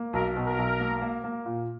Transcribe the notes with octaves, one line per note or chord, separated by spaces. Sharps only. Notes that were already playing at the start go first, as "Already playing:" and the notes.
Already playing: A#3
B1 A#4
B2
A#4
B1
A#3
A#3
A#3
A#2